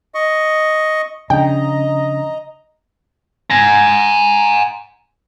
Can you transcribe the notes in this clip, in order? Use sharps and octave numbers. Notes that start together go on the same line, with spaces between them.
D#5 C#6
C#3 F3 D4 D#5 G5 A#5
G#5 A#5